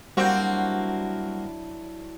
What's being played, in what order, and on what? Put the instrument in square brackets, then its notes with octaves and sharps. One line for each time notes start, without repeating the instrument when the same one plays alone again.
[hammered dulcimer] F#3 D4 E4 [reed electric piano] G3 G6 [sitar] A#3 C4 F#4